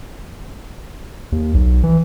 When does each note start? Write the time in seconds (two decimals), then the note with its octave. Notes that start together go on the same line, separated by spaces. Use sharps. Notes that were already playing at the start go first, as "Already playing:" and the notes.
1.32 D#2
1.54 B1
1.83 E3